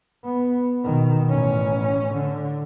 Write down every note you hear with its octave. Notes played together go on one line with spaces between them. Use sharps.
B3
B2 D#3
A1 C#4
D3